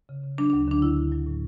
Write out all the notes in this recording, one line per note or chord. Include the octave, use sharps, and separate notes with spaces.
C#3
C#3
F#3 D4
D4
D2
D3 D4
D2 E4
D2
F#3
A2